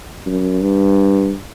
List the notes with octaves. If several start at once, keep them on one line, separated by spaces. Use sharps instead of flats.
F#2
G2